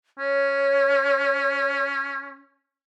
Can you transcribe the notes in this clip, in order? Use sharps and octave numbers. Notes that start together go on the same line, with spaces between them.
C#4 C#5